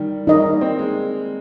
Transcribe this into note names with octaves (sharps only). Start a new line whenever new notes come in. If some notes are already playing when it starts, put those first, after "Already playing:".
Already playing: D#3 G3
D#3 D#4 A#4 D#5
G3
A#3
C4
G#3